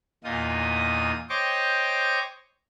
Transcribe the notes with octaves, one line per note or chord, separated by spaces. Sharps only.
E2 A#2 D#4 F4 D#6
C5 C#5 D#5 G5 C#6 D6